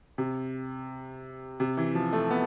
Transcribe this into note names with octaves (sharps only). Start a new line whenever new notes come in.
C3
C3
E3
F3
A3
B3